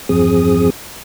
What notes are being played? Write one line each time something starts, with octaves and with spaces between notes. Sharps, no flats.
E2 G2 F3 C4 G#4 D#6